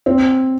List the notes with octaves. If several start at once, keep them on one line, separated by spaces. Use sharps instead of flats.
C4